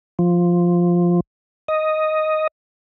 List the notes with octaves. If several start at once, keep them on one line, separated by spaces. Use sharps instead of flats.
F3
D#5